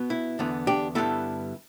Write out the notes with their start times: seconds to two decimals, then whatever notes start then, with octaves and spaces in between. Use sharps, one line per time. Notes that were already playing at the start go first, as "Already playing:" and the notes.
Already playing: B2 B3
0.10 E4
0.39 E2 D3 B3
0.67 D4 G4
0.95 G2 D3 G3 B3 E4 A4